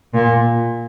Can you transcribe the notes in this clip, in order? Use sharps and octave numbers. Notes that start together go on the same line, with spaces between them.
A#2